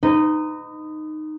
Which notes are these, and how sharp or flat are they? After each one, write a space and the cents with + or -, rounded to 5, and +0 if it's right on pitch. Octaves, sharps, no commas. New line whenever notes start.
D#4 -10 B4 +40